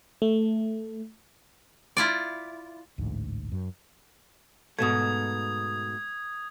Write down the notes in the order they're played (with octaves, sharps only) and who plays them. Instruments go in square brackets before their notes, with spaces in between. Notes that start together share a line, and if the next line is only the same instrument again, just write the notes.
[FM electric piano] A3
[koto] E4 F4 D5
[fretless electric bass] A1 D2 G#2
F#2
[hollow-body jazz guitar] G#2 B2 A3 [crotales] D#6 G#6